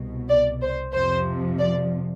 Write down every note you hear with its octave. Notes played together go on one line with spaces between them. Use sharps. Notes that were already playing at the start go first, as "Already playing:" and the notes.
Already playing: C2 B2
D5
C5
F2 C3 F3 C5
D5